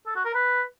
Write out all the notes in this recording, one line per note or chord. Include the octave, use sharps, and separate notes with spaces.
A4
F#4
A#4
B4